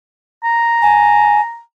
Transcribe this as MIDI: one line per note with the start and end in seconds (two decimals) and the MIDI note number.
0.44 1.60 82
0.82 1.41 80